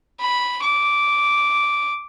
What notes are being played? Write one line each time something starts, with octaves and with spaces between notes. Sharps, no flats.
B5
D6